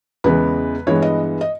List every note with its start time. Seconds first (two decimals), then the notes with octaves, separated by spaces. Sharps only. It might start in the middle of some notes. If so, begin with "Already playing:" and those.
0.24 E2 C#3 E3 G#3 B3 B4
0.87 G2 E3 G#3 B3 C#5
1.02 D#5
1.41 D#5